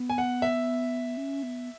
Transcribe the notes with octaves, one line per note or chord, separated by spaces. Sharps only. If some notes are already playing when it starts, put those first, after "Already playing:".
Already playing: B3
G#5
F#5
E5
C#4
B3